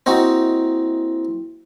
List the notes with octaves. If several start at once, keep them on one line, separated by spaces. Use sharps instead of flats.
A#3 C4 D#4 E4 F#4